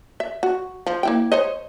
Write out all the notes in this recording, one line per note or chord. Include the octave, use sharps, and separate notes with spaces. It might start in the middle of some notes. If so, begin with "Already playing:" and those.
E5
F#4
F3
A#3 E4 G5
C5 C#5 D#5